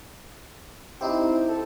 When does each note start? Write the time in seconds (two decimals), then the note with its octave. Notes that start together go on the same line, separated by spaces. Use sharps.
1.01 C4 D#4 E4 G4
1.48 A4